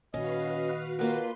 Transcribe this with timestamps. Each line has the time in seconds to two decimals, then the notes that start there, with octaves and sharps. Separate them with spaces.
0.14 A#2 D#3 C#4 F#4 B4 D#5 F5
0.99 D#2 A#3 F4 F#4 B4 C6